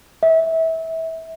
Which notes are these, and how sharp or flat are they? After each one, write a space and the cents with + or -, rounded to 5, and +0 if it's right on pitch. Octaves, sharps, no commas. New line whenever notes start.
E5 -25